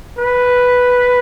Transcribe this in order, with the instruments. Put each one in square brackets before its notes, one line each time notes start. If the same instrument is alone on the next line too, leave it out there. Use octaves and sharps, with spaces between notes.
[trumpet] B4